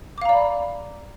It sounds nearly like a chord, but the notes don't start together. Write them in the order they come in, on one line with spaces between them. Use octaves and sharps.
D6 F5 A#5 D5 B5